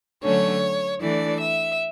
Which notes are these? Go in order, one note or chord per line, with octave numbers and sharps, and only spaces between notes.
D3 F#3 A3 C#4 C#5
E3 A3 D4 D5
E5